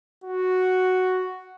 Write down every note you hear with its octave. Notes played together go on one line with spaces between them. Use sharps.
F#4